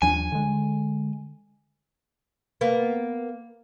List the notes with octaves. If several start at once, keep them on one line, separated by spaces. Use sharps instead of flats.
D#2 F3 D4 G#5
D3 G#3
A#3 B3